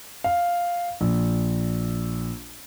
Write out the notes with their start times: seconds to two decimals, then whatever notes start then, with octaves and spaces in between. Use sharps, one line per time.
0.24 F5
1.01 A#1